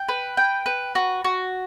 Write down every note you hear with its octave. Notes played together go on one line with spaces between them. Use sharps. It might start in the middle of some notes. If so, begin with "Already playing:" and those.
Already playing: G5
B4
G5
B4
F#4
F#4